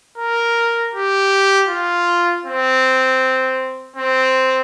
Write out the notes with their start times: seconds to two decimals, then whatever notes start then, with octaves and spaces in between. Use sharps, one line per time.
0.17 A#4
0.94 G4
1.68 F4
2.45 C4
3.96 C4